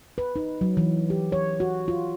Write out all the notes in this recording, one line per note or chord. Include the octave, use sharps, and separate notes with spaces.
B4
D#4
F#3
E3
G4
C#5
F#4
F4